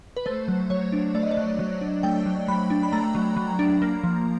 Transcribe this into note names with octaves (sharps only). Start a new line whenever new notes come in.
B4
A3 C5
F#3
F#3 C#5
D4
A3 D5
D#5
D5
F#3
F#3
D4
A3 G5
F#3
F#3 B5
D4
B5
A3 A#5
F#3
F#3
D4
A#3
F3